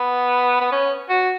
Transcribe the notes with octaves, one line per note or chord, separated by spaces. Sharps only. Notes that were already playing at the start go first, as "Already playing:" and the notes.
Already playing: B3
B3
C#4
F#4